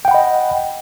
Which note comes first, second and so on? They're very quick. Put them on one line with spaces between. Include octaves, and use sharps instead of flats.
G5 F#5 B5 D#5